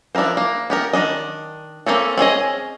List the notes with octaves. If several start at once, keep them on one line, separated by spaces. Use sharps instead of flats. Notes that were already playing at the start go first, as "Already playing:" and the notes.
F3 D4 E4 A#4 C5
A#3
B3 G4 A#4
D#3 A#3 D4 D#5
A#3 C4 C#4 A4
C4 C#4 G#4 D#5